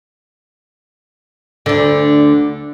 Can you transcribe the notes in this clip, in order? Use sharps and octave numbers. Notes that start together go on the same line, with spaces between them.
D2 D3